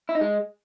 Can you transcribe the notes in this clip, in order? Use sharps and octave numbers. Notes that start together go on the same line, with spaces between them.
E4
D#4
G#3